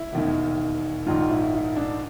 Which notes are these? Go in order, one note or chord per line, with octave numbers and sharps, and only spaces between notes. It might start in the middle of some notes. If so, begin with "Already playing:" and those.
Already playing: E4
E1 D#2 D#3
A#1 G#2 D#3 F4
E4
E4
D4